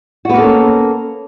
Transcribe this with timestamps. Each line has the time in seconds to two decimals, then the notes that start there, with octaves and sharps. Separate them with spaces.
0.25 F#4
0.29 B3
0.34 A#3
0.38 A4
0.43 C#4